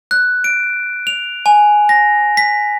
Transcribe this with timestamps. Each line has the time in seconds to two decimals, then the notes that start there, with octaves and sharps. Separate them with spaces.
0.11 F#6
0.44 D7
1.07 F7
1.46 G#5
1.89 A#6
2.37 B6